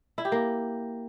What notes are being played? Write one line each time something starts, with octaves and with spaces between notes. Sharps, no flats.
E4
G4
A#3